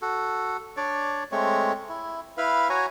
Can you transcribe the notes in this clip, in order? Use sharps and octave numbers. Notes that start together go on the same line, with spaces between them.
F#4 A4
D4 C#5 D5
G#3 A3 C4 C#5
E4
E4 B4 F5
F#4 C#5 G#5 A#5